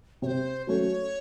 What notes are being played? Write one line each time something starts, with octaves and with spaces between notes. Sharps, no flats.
C3 C5 C#5
F#3 A3 C#4 C#5